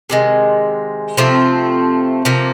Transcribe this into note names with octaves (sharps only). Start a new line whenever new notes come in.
C3 D#3 G#3
C3 F3 A3 C4
C3 F3 A#3